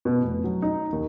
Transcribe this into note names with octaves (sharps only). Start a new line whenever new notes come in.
B2
F1
F#3
D#4
D#2